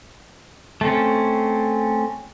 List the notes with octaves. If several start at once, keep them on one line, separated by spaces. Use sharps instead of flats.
A3 C4 C#4